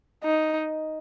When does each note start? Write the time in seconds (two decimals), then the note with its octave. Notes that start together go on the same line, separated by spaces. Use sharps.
0.24 D#4